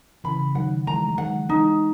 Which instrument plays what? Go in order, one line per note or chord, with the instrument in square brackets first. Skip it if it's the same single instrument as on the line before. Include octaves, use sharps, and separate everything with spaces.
[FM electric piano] C#3 E3 [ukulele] B5
[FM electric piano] D#3 F#3 [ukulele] F#5
[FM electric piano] E3 G#3 [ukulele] A#5
[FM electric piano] G#3
[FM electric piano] D#3 F#3 [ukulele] F#5
[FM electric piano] E3 G#3 [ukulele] D#4